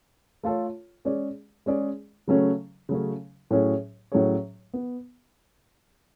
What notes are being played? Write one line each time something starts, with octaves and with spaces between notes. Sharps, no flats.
A3 F4 A4 C#5
G#3 C#4 G#4 D5
G#3 C#4 G#4 D5
C#3 F#3 A3 C#4
C#3 F#3 A3 C#4
A2 F#3 C#4 G#4 C#5
A2 F#3 C#4 G#4 C#5
B3